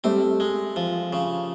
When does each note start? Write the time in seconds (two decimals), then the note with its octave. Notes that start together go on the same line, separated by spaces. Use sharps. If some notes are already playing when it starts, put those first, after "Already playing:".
0.04 G3 A3 C4
0.40 G#3
0.76 F3
1.13 C#3